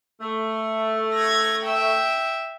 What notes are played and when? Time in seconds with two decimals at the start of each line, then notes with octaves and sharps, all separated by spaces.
0.21 A3
1.14 G#6 A#6
1.63 E5 G5